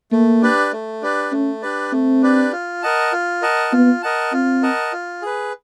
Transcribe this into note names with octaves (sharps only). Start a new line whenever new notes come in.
A3 A#3
D4 G4 B4 D5
A3
D4 G4 B4 D5
A3 C#4
D4 G4 B4 D5
A3 C4
D4 G4 B4 D5
F4
A#4 D#5 F#5 A5
F4
A#4 D#5 F#5 A5
B3 F4
A#4 D#5 F#5 A5
C4 F4
A#4 D#5 F#5 A5
F4
G#4 B4